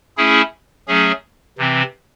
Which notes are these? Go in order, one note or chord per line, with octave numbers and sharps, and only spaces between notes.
A3 C#4 E4 G#4
F#3 A3 C#4 G#4
C3 E3 C4